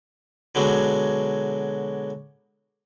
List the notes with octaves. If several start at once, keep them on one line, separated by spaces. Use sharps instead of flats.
B2 D3 F#3 G#3